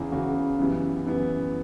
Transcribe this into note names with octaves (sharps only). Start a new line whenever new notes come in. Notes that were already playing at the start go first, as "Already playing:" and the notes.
Already playing: E2 C#3 E3
E2 C#3 E3 F#4
F#2 E3 G3 B3
F#2 E3 G3 B3